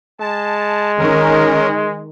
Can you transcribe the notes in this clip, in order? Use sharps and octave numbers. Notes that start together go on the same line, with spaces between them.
G#3 A5
D#3 C#4 A#4